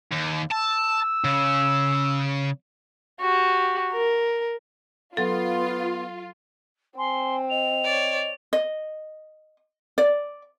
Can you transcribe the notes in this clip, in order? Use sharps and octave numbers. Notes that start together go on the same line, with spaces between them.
D#2
A5 E6
C#3
F#4 G4
A#4
F#3 B3 F4 A4
C4 G#5 C6
D#5 F7
C#5 D5
D#5
D5